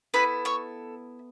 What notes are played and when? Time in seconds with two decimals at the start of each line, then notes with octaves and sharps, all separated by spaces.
0.14 B3 E4 A4 B4 B5
0.45 C#5 C#6